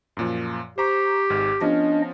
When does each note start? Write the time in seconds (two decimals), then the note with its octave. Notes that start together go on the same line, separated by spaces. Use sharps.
0.17 F#2 A#2 F3
0.78 G4 C5 A#5 C#6
1.30 G#1 G#2 F6
1.61 F3 B3 C#4 D4 D#5